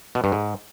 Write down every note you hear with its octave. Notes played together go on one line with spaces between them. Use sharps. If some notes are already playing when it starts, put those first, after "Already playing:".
B2
G2
G#2